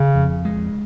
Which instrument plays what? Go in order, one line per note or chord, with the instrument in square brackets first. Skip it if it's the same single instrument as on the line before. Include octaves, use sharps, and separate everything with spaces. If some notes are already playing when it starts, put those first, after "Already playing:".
Already playing: [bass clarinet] C#3
[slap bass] F2
G#3